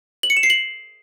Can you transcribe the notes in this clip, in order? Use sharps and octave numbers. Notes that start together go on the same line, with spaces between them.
F#7
C#7
E7
C7
F#7